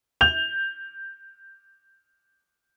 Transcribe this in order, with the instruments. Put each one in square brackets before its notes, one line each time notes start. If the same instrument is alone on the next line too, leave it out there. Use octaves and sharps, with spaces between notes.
[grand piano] G6 F7